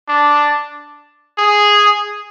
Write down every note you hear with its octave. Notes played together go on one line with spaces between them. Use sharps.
D4
G#4